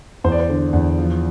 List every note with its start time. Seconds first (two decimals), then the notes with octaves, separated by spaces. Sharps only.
0.24 E2 C5
0.32 D5
0.40 C5
0.49 D3
0.73 E2
0.98 F3